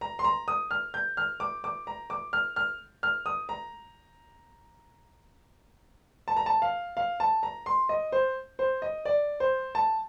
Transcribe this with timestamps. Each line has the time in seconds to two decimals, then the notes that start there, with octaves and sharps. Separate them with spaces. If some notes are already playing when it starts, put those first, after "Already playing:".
0.01 A#5
0.19 C6
0.24 A#5
0.48 D#6
0.71 F6
0.94 G6
1.17 F6
1.40 D6
1.64 D6
1.87 A#5
2.10 D6
2.33 F6
2.56 F6
3.03 F6
3.26 D#6
3.49 A#5
6.28 A5
6.37 A#5
6.46 A5
6.62 F5
6.97 F5
7.20 A5
7.43 A#5
7.66 C6
7.89 D#5
8.12 C5
8.59 C5
8.82 D#5
9.05 D5
9.40 C5
9.75 A5